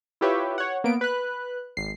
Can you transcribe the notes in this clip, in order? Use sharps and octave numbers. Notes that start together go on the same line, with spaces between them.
E4 F4 G4 B4 C#5 E5
C#5 F#5
A#3 B3 D7
B4 F#6
G#1 C7